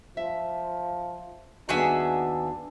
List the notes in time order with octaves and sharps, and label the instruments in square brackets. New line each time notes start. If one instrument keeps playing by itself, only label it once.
[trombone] F3 [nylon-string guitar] E5
[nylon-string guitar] D#2 B3 G#5 [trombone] D4 [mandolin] F#4 G#4 E5